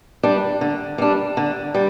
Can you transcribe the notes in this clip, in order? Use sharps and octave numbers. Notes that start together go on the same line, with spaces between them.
G3 D4
D3
G3 D4
D3
G3